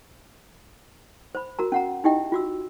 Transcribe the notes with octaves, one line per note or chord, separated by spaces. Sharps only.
C5 B5
F#4 A#4 A#5
C#4 F#5 A#5
D#4 E4 G4 D#5 E5 G5
F4 F#4 E6